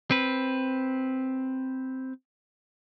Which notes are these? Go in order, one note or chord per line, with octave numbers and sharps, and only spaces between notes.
C4 B4